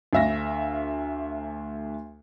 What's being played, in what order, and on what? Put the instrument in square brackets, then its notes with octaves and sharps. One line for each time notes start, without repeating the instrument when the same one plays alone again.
[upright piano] D2 A3 E5 F5 A#6